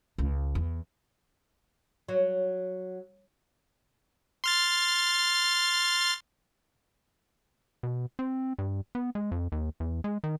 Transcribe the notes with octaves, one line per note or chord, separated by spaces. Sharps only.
C#2
E2
F#3
C6 F6 A6
B2
C4
G2
B3
G#3
F2
D#2
E2
G#3
D#3